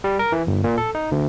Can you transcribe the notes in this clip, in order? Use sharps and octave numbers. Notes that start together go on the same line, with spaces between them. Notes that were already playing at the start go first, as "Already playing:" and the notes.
G3
A#4
E3
G1
A#2
A4
D#4
D2